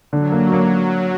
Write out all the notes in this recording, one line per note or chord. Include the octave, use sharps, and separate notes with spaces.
D3 F#3
A#3
A#3